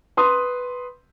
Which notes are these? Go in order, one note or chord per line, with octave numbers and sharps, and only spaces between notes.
B4 C6 D#6